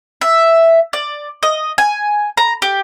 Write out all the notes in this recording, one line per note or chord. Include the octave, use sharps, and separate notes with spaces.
E5
D5
D#5
G#5
A#5
G4